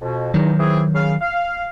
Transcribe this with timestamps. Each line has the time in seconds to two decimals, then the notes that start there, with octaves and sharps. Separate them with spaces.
0.02 F2 B2
0.34 E2 D#3 F#3 D#4
0.60 E3 C4 G#4
0.95 C#3 F5
1.21 F5